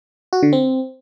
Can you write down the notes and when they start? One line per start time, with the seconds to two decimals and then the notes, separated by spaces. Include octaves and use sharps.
0.33 F#4
0.43 D3
0.53 C4